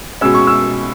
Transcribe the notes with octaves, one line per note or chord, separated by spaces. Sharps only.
B2 G#3 C#4 E6
C#6
E6